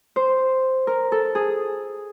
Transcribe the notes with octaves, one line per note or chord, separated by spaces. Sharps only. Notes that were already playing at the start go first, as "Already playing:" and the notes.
C5
A#4
A4
G#4